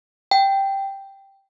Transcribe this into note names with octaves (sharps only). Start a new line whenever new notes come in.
G5